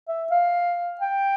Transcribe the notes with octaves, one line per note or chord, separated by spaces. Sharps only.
E5
F5
G5